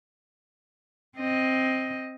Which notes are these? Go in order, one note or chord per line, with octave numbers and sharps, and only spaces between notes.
C4 D#5